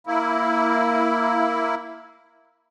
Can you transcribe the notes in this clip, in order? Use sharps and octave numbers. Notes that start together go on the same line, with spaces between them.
A#3 E4